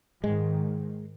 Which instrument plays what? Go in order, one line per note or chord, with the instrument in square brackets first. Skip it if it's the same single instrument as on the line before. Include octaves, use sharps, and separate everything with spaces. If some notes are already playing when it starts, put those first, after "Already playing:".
[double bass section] G#2 D#3 [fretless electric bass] G#3